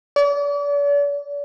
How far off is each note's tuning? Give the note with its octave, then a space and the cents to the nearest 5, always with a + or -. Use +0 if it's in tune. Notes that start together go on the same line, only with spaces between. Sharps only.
D5 -40